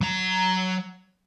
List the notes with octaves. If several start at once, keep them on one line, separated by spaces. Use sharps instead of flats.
F#3 A#5